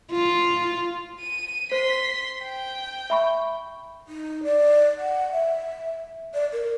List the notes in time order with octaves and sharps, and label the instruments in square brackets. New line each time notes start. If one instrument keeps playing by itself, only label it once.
[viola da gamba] F4
[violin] D#7
[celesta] C5 [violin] C6 B6
[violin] G5
[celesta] E5 B5 C#6
[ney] D#4
D5
F#5
E5
D5
A#4